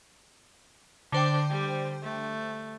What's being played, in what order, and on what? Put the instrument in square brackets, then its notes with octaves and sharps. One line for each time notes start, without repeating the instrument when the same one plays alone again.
[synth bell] D3 C5 G5 [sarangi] D4
[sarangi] G3
A3